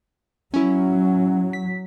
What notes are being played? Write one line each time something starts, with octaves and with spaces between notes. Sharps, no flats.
F#3 C#4 E4
B6